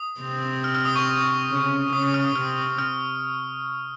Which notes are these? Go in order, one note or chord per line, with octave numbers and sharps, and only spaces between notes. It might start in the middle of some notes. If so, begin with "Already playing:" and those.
Already playing: D#6
C3 C4
F6
F6
D#6
C#6
C#3 C#4
C#3 C#4 D#6
D#6
F6
D#6
C3 C4 F6
F6